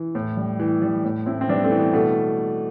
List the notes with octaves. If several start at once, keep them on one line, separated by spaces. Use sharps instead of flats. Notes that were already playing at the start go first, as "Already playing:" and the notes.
Already playing: E3
A2
G3
E3
G3
A2
A2 C4 E4
C4
G3 B3 D4
A3 C4
E3
B3
B2 A3